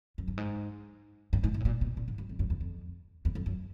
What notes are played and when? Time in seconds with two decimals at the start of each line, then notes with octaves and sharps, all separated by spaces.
0.18 F#2
0.28 G2
0.37 G#2
1.33 G2
1.44 G#2
1.54 A#2
1.60 A2
1.65 A#2
1.81 B2
1.97 A#2
2.08 G#2
2.18 F#2
2.29 F2
2.39 F#2
2.50 E2
2.61 F2
3.25 E2
3.35 F2
3.46 F#2